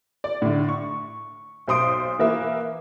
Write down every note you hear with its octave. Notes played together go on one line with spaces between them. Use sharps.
D5
A2 D3
C#6
B1 C5 C6 D#6 D7
E3 A#3 B4 E5